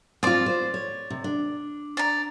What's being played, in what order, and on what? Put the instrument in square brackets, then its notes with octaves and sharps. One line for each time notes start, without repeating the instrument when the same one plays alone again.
[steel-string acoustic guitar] C4 F4 [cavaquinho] D5 D6
[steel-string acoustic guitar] C5
C#5
C3
D4
[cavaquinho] D5 A#5